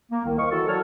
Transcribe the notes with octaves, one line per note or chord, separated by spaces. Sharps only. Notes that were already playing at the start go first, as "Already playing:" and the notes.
A#3
C2 D#3
C5 D#5 F5 C#6
E3 E4 F#4 A4
F#3 F#4 A4 C#5 D5 F6